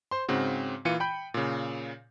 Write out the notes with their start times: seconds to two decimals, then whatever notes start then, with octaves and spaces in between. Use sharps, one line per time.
0.11 C5 C6
0.28 G#2 C#3 C4 F#4
0.85 A#2 E3 F4 C#7 D#7
1.00 G5 B5 G6
1.34 A#2 C#3